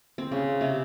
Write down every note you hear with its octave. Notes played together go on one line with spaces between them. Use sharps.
C4
C#3
C3